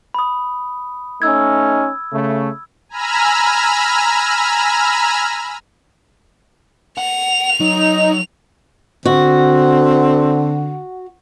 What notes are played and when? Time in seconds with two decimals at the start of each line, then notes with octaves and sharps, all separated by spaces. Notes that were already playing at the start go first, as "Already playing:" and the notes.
0.14 B5 D#6
1.22 A3 C#4 D#4 E6 G#6
2.12 C#3 A3
2.89 G#5 A#5 B5 E6 F6
6.97 F#5 F7
7.60 F#3 D#4
9.05 D3 C4 F#4